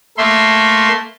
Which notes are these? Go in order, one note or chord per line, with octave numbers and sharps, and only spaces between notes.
A3 A#3 E5 C6